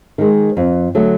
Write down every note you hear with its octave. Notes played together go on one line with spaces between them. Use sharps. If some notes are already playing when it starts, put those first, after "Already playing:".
D#3 G#3
F2
D3 F#3 A3